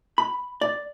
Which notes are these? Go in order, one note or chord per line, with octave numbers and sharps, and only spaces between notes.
B5
D5